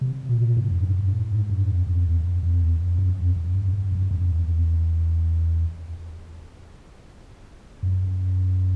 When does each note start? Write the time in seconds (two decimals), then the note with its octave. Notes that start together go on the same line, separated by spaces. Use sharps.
0.01 C3
0.29 A#2
0.57 G#2
0.70 F2
0.85 F#2
0.99 G2
1.13 A2
1.32 G#2
1.50 F#2
1.69 F2
1.87 F2
2.06 E2
2.24 F2
2.43 F2
2.62 E2
2.80 F2
2.99 F#2
3.17 F2
3.36 F2
3.54 G2
3.73 G2
3.92 F#2
4.11 F2
4.29 E2
7.83 F#2